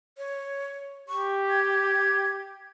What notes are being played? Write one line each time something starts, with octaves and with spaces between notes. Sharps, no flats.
C#5
G4 C#6
G#6